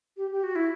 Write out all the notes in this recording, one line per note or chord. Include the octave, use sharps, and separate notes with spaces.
G4
G4
F#4
E4